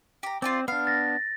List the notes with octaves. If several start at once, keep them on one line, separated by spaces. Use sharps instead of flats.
G4 A#5
C4 F4 G4 D5
B3 D4 F5
A6 A#6